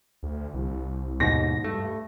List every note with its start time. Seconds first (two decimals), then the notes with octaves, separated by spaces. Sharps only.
0.23 D2
0.54 C2
1.20 D#2 G#2 B2 A#6
1.64 G2 A3